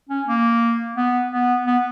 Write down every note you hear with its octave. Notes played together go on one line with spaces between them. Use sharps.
C#4
A#3
B3
B3
B3